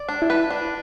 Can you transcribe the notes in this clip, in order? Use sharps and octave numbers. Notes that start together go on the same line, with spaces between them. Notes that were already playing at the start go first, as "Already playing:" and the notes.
Already playing: D5
D4
E4
B4
D4